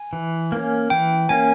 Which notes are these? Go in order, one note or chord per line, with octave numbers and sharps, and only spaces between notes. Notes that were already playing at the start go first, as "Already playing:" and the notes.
Already playing: G#5
E3
A#3 C#4
E3 G5
A#3 C#4 G#5